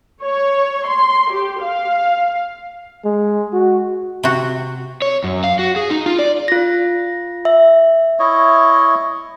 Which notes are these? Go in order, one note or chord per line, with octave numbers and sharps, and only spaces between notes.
C#5
C6
G4
F5
G#3
F#4
C3 F#4
C#5
F#2
F5
F#4
G#4
D#4
F4
D5
F4 A#6
E5
E4 C#5 D#5